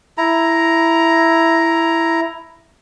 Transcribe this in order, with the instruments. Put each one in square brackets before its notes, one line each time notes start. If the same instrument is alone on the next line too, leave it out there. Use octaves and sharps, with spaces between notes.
[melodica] E4 A#5